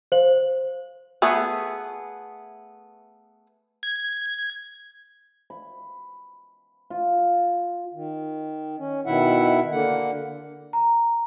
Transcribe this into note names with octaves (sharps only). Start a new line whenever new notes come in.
C5 F5 F#7
A3 B3 G#4 B4
G#6
B5
F4
D#3
C#4
B2 D#3 E4 E5 F#5
D3 A#3 F#5
A#5